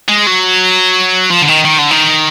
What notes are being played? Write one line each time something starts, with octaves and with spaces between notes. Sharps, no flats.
G#3
F#3
F3
D3
D#3
D#3
D3
D#3